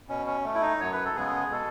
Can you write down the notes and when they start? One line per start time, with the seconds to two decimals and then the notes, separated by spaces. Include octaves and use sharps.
0.09 B2 C#4
0.27 C#4
0.44 A3
0.55 E4
0.62 D#4
0.80 F#2 C#5
0.93 B4
1.05 A4
1.16 C#3 G#3 B3 G#4
1.51 B2 A4